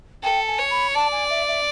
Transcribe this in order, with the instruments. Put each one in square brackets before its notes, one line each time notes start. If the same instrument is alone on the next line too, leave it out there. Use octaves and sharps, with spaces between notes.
[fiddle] A4 [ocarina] G5
[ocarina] G#5
[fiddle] C#5
[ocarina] B5
[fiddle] D5 [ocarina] A5
[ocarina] G#5
E5
E5